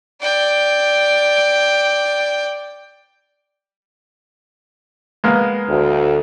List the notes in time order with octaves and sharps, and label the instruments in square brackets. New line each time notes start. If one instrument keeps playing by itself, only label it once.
[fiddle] D5 G5
[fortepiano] G#3 A#3 B3
[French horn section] D2